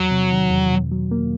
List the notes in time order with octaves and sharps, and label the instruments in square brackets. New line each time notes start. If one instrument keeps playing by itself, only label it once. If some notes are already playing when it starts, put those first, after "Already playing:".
Already playing: [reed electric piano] E2 [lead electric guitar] F#3
[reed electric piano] C3
D#3
E2
B2
F#3
A#3